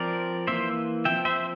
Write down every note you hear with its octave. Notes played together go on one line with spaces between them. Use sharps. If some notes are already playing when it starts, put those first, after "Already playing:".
Already playing: F3 C4 A#4 D5
E3 A#3 C5 E5
F3 C4 E5 G5
C5 E5